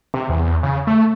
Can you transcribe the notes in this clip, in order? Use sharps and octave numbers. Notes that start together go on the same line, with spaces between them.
C3
E2
C#3
A3